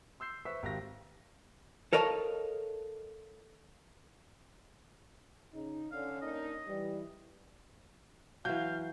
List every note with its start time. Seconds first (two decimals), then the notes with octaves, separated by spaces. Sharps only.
0.20 C6 E6 G6 C7
0.45 B4 C5 E5 C#6 E6 B6
0.63 G#1 G4 F5 A#6
1.93 A4 A#4 C#5 D#5 F5 A5
5.53 C#3 D#4
5.92 D3 C#4 F5
6.22 A#3 D4 D#4 D#5
6.68 E3 G3
8.45 E3 F#3 F5 G6